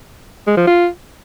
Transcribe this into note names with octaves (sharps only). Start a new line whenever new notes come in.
G#3
F3
F4